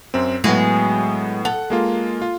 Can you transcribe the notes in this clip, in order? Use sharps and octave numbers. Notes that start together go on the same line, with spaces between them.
F#2 C4
A2 F#3 G#3 B3 F#4
A4 F#5
G#3 A#3 F4
F4